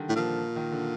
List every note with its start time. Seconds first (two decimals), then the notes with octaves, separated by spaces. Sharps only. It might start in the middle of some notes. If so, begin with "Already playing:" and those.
Already playing: D3 D#3 G3
0.09 A2
0.16 A#2 F3
0.56 D#3
0.72 D3